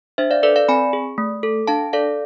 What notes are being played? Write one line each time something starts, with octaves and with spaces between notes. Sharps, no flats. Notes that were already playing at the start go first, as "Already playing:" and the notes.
D4 C5 E5
D5 F5
A4 B4 D5
D5 F5
C4 G#5 B5
G#4
A3
A4
D4 F5 A5
A4 D5 F5